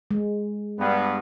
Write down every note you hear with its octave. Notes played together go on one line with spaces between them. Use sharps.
G#3
G2 B3